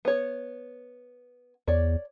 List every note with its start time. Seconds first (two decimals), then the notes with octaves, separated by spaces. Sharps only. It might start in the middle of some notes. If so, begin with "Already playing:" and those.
0.05 B3 C#5
1.67 E2 C#5 D5